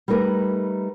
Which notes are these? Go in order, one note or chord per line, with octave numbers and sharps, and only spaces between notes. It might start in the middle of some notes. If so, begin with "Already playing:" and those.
G3 A3 D#4 A#4 B4